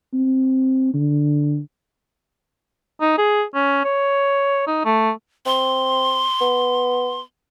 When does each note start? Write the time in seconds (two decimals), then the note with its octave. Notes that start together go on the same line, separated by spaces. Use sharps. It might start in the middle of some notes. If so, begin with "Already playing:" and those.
0.14 C4
0.94 D3
3.01 D#4
3.18 G#4
3.54 C#4
3.84 C#5
4.67 D#4
4.85 A3
5.46 C4 C6
6.41 B3